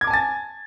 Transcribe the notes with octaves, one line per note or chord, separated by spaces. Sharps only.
G#5 A5 D6 G#6 A6